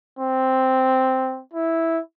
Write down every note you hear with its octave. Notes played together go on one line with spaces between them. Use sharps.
C4
E4